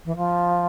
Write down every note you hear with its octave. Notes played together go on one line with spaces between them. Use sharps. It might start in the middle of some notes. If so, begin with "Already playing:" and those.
E3
F3